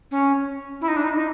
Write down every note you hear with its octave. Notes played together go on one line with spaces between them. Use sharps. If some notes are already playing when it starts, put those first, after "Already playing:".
C#4
E4
D#4
D4
D#4
E4
D#4